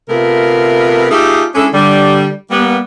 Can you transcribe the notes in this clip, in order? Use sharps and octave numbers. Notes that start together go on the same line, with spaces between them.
C3 A3 B3 F4 A#4
A3 D#4 F4 G4 G#4
G#3 C#4 D4 E4 G#4 A4
D3 G3
G3 A#3 B3